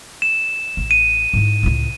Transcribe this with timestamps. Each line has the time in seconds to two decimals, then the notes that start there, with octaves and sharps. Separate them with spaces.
0.22 E7
0.77 A1
0.91 D#7
1.33 G#2 E4
1.63 C#2 A2